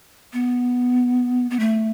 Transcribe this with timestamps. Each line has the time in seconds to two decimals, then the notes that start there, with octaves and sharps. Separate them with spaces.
0.33 B3
1.51 B3
1.59 A3